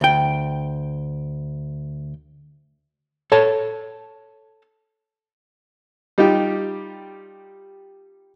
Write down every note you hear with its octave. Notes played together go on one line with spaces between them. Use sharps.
D2 G5
A4 C#5 A5
G3 D#4 F4 G4 G5